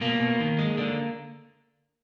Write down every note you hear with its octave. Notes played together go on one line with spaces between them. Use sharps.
B2 A#3
B2
D#3
G#3
D3